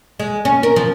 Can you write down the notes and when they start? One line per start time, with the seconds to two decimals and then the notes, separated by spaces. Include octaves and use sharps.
0.20 G#3
0.45 C#4
0.63 A#4
0.76 F3